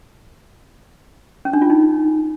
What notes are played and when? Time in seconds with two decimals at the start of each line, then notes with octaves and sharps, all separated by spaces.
1.45 C#4
1.53 D4
1.62 F4
1.70 D#4